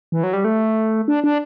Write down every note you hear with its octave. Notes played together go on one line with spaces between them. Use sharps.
E3
F#3
G3
A3
D4
D4